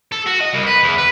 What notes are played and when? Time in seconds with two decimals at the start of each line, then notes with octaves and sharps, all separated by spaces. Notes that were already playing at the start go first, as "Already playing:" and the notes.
0.12 A4
0.26 F#4
0.41 D#5
0.54 C2
0.67 B4
0.83 E2
0.98 B4